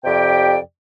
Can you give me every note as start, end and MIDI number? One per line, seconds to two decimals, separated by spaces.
0.04 0.58 41
0.04 0.58 48
0.04 0.58 67
0.04 0.58 74
0.04 0.58 79